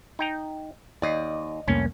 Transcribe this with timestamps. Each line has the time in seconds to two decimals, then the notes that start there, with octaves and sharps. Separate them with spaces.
0.19 D#4 G5 A#5
1.02 D#2 D5 D#5
1.68 C2 F2 A3 A#3 C#4